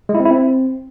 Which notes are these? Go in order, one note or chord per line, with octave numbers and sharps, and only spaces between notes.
G#3
E4
C4
E4
C4